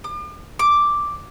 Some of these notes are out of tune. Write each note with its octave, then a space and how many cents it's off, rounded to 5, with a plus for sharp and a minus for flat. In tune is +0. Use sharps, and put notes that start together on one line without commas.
D6 +45
D6 +0